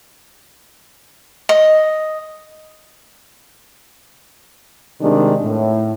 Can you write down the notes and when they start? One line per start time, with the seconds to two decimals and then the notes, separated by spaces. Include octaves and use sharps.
1.49 D#5
5.01 C3 D#3 G3 G#3 D4
5.43 A2